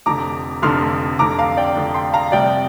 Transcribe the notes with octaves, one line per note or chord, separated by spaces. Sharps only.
F1 F2 D3 A#5 D6
F1 F2 D3 C6 F6
F1 F2 D3 A#5 D6
F5 A#5
D5 G5
F1 F2 D3
G5 C6
F5 A#5
F1 F2 C3 G3 D5 G5